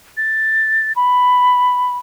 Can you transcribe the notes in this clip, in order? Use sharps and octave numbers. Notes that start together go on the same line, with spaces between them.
A6
B5